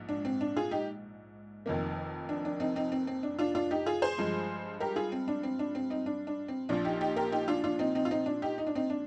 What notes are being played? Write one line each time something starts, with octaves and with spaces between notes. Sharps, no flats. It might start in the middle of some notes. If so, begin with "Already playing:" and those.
Already playing: A#1 G#2
D4
C4
D4
F4 G#4
D#4 G4
F1 F2 D#3 A#3
D4
D4
C4 D#4
C4 D#4
C4
C4
D4
D4 F4
D4 F4
D#4 G4
F4 G#4
G#4 C5
G2 F3 G#3
G4 A#4
F4 G#4
C4
D4
C4
D4
C4
C4 D#4
D4
D4
C4
A#1 A#2 F3 D4
D#4 G4
D#4 G4
G4 A#4
D#4 G4
D4 F4
D4 F4
C4 D#4
C4 D#4
F4
C4 D#4
D4
D#4 G4
D#4
D4
C4 D#4
D4